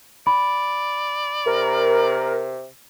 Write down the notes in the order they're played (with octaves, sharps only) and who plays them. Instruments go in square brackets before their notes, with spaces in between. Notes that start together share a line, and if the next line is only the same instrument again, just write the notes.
[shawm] D5 [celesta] B5
[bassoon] C3 [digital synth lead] A#4